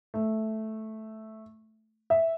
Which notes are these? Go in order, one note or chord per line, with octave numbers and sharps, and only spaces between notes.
A3
E5